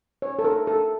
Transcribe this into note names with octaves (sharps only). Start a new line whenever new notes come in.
C#5
A4
A#4
A4